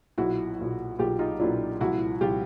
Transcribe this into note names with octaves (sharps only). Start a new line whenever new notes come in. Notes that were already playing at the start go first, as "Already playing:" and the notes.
B1 A#2 F#3 E4 F#4
B1 A#2 F#3
B1 A#2 F#3 F4 G4
D#4 F4
B1 A#2 F#3 D4 E4
C2 A#2 F3 E4 F#4
C2 A#2 F3 F4 G4